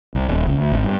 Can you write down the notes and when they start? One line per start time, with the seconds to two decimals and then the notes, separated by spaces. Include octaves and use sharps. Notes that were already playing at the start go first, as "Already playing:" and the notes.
0.15 C2
0.28 D#1
0.47 C#2
0.58 D2
0.72 G#1
0.84 G2